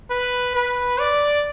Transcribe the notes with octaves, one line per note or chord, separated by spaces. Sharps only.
B4
B4
D5